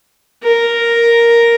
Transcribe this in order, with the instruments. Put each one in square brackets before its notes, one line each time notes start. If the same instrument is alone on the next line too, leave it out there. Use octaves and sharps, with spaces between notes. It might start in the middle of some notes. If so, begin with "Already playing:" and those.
[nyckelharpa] A#4